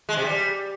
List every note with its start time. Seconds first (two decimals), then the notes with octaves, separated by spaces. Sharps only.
0.09 G#3
0.17 C3
0.25 G3